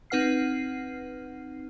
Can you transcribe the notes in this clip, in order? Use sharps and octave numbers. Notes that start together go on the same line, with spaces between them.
C4 D#4 B4 F#5 F6 C7